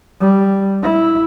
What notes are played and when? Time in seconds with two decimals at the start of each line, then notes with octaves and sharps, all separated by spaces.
0.20 G3
0.83 E4